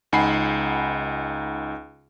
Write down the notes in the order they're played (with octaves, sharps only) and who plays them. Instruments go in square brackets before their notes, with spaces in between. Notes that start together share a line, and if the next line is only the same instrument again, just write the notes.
[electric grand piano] C#2 D#4 F#5 G#5 B5 C7